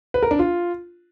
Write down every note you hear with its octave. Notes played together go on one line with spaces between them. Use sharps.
B4
A#4
D4
F4